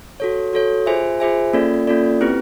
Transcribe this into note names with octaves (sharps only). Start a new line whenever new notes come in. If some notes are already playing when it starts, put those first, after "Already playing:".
F#4 A4 C#5
F#4 A4 C#5
F4 G#4 C5 E5 G#5
F4 G#4 C5 E5 G#5
A#3 C#4 F4 A4 D5
A#3 C#4 F4 A4 D5
C4 E4 G4 B4